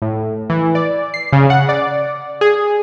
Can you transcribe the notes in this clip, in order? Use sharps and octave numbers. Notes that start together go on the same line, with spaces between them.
A2
E3
D5
C7
C#3
F#5
D5
G#4